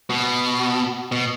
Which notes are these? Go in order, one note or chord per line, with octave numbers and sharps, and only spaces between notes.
B2
B2